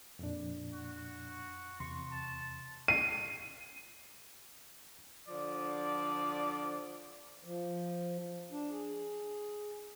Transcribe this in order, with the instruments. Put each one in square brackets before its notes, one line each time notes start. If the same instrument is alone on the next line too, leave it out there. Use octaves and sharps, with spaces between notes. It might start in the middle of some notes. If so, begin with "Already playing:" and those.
[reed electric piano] F2 A#2 D4
[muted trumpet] F#4
[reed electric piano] E2 C3 C6 [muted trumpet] C#6
[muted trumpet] A5
[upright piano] C7 D#7
[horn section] D3 F3 D5
[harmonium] F3
D4
G#4